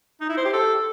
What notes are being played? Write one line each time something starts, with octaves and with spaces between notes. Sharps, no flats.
D#4
E4
C5
G4
A4